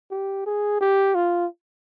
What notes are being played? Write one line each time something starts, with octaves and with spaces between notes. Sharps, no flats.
G4
G#4
G4
F4